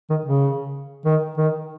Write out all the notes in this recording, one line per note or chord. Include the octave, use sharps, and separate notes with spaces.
D#3
C#3
D#3
D#3